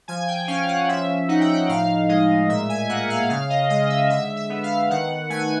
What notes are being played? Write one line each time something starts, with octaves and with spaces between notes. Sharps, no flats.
F3 G#5
G5
C#4 F5
F#5
F3 E5
D#4 F#5
G5
F#5
A2 F5
G#3 D#5
A#2 E5
G#5
A#3 F#5
F5
C#3 F5
D#5
G#3 D#5
E5
D3 E5
E5
B3
F5
D#3 F#5
A3 G#5